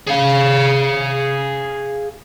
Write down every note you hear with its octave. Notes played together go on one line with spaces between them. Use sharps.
G#4 F5